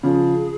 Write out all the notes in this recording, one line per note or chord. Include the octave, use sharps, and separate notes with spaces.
C#3 F3 G#4